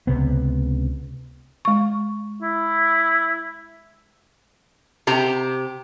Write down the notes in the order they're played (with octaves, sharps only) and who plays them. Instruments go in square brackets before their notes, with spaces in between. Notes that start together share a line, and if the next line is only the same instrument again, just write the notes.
[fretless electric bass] C#2 C3 B3
[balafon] G#3 C#6
[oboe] E4
[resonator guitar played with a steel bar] C3 G4 A#5